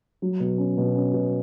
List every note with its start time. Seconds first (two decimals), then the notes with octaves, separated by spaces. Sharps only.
0.22 F#3
0.40 B2
0.58 C#4
0.78 B2
0.96 C#4
1.14 B2